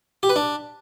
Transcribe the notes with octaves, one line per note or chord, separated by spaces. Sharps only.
G4
B4
D4